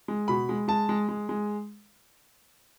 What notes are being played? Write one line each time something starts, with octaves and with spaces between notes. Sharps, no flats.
G#3
B2 B5
G#3
G#3 A5
G#3
G#3
G#3